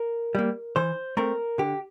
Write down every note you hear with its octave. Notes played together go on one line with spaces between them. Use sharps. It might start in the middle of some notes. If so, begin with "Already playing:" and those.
Already playing: A#4
G3 A#3
E3 C5
A3 C4 A#4
D3 G4